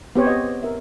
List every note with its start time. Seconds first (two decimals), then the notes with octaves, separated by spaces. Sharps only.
0.16 B3 C4 G4 G#4 C5 C#5
0.27 G4 D#5
0.63 A#4 E5